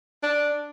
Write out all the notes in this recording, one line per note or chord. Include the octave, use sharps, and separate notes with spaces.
D4